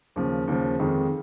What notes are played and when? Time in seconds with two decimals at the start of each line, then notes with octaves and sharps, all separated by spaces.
0.16 D#2 C#3 F3
0.48 D#2 C#3 F3
0.80 F2 D#3 G#3